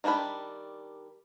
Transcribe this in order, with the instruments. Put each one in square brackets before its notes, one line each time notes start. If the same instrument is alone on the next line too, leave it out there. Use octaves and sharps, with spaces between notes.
[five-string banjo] D#3 G3 D4 G5 B5